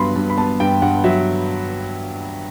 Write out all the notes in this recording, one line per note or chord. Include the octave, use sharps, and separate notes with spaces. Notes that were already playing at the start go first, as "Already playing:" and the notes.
Already playing: G2 F#3 B3 B5 C6
G2
B5
B3 A5
G2 G5
G2 F#5
F#3 E5